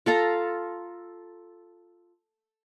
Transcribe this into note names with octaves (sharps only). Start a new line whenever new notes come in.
F4 A4 F5 A#5